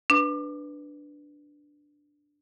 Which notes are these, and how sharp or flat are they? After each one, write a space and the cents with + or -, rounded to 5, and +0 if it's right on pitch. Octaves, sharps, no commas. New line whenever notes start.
D4 +0 B4 +0 D6 +30